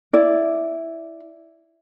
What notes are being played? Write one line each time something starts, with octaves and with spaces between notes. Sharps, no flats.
E4 D5